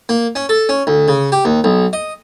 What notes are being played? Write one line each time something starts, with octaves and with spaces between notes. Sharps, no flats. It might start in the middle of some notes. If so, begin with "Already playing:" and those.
A#3
C#4
A4
C#4
D2
C#3
G4
D#2
B1
D#5